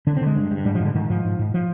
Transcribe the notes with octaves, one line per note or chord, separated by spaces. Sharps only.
D3 D4
C4
D3 G#3
G2
G2
G#2 G3
F3
G#2 D3
G#2 D#3
G#2 F3
G#2
G#2
F3